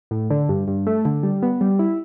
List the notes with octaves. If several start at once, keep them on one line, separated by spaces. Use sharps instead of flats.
A2
D3
G2
G2
A3
D3
G3
B3
G3
E4